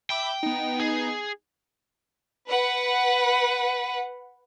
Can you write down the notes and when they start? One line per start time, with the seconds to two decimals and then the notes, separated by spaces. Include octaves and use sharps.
0.10 E5 G5 B5 D6
0.43 B3 D#4
0.80 G#4
2.47 B4 F#5